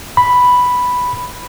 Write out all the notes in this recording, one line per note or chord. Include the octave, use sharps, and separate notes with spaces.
B5